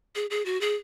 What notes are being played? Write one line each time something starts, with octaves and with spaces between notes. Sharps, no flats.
G#4
G#4
F#4
G#4